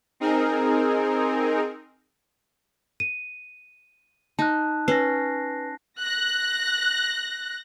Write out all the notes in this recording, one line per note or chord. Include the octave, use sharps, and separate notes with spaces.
C4 D#4 G#4 A#4
D#7
D#4 A5 F#6
C#4 B4 A#6 C7
F#6 A#6